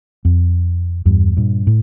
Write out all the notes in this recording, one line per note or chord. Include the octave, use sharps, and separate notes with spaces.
F2
E2 G2
G2 A#2
A2